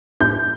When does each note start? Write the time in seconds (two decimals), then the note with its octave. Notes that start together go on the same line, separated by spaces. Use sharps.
0.20 G6